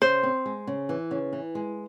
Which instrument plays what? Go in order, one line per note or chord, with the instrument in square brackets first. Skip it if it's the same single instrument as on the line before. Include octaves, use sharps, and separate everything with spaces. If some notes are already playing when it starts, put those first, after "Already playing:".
[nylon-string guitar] C#3 [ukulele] C5
[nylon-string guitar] C4
G#3
C#3
E3
C#3
E3
G#3